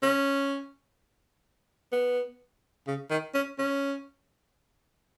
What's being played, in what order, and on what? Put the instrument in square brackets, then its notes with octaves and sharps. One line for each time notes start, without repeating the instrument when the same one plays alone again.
[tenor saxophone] C#4
B3
C#3
D#3
C#4
C#4